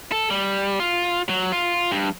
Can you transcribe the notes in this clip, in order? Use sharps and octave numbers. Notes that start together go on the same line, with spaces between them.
A4
G3
F4
F#3
F4
G2